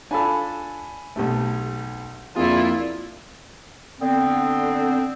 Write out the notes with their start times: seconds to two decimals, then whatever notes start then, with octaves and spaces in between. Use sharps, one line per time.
0.11 D4 F4 A4 G#5 B5
1.16 B1 C3 A3
2.36 F2 A#3 D4 E4 F4 G#4
4.00 D3 B3 C4